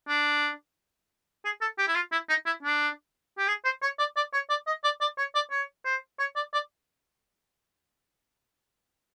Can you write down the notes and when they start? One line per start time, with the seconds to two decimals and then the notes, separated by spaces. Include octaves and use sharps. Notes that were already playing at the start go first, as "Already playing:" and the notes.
0.09 D4
1.45 G#4
1.61 A4
1.78 G4
1.88 E4
1.95 F4
2.12 E4
2.29 D#4
2.46 E4
2.63 D4
3.38 G4
3.48 G#4
3.65 C5
3.82 C#5
3.99 D5
4.16 D5
4.33 C#5
4.50 D5
4.67 D#5
4.84 D5
5.01 D5
5.18 C#5
5.35 D5
5.51 C#5
5.85 C5
6.19 C#5
6.36 D5
6.53 D5